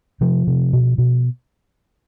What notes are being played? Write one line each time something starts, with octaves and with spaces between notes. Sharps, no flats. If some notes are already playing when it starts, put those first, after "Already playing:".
C3 F3
C3
B2
B2